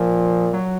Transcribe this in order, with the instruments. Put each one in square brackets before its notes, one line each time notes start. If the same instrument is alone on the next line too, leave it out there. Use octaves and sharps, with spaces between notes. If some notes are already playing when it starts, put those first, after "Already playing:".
Already playing: [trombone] A#2 [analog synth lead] F3
[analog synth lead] F#3